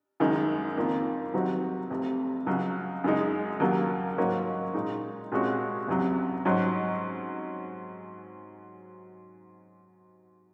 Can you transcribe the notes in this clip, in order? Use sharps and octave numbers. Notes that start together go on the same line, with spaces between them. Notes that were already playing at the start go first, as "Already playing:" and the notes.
F#1 F#2 D#3 G#3
F2 D#3 A#3 F4
C3 D#3 F#3 C4 F#4
F1 F2 C3
C#2 C#3 F#3
F#2 C#3 G#3 D#4
D#2 C#3 F#3 A#3
G#2 F#3 A#3 C#4 F#4
A#2 G#3 D#4
C2 A#2 G#3 C#4 F#4
F#1 F2 C3 F#3
G#2 F#3 C#4